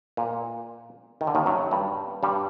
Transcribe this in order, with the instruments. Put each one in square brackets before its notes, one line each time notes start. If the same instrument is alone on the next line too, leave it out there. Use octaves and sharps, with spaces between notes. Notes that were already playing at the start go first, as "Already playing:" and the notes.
[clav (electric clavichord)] A#2
D#3
D3
D#2 D#3
F#2 F#3
G2 G3
G2 G3